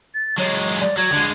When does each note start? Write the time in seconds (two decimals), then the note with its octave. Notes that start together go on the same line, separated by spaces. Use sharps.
0.14 A6
0.38 F#3 G#3 C#5
0.81 D5
0.98 F#3 G#6
1.13 D3 G#3